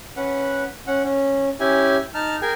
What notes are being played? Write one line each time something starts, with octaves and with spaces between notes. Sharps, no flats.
C#4 B4 F#5
C#4 F#5
C#4
C#4 E4 G4 G#5
D#4 A5 F6
G#4 A#4 G5 G#5